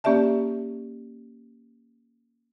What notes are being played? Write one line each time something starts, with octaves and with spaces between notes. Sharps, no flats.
A#3 C#4 G4 D5 E5 A5